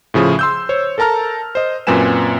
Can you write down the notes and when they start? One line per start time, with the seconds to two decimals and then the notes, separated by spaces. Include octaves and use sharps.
0.14 A2 C#3 F3 G#4
0.39 C6 E6 G6
0.69 C5 C#5
0.98 A4 A#4 A5 A#5 F6
1.55 C5 D#5
1.87 F#2 A#2 C4 B4 G#5 E7